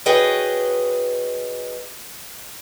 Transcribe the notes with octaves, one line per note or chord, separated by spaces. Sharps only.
F#4 G#4 B4 C#5 D#5 G5